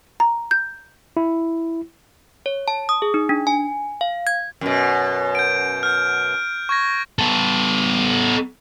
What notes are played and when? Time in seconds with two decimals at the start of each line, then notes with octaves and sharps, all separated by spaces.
0.20 A#5
0.51 G6
1.17 E4
2.46 C#5
2.68 A5
2.89 D#6
3.02 G#4
3.14 D#4
3.29 D4
3.47 G#5
4.01 F5
4.27 G#6
4.61 F#2 B2
5.35 G6 D7
5.83 F6 G6
6.69 C#6 G#6 A#6
7.19 B3 A4